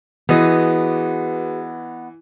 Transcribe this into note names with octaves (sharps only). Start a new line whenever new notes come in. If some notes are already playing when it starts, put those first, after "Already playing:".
E3 B3 F#4 G#4 B4 D#5